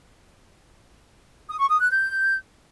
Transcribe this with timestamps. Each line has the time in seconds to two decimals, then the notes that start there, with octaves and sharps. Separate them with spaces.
1.48 D#6
1.59 C#6
1.70 D#6
1.80 F#6
1.91 G6